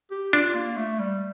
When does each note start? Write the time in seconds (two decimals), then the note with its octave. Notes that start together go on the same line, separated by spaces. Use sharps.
0.11 G4
0.33 D4 F4
0.55 A#3
0.77 A3
0.99 G3